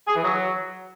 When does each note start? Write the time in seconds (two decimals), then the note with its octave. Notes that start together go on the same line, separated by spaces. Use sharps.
0.08 G#4
0.16 E3
0.24 F#3